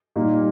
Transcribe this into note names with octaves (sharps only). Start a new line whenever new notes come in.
A#2 G3 A#3 D#4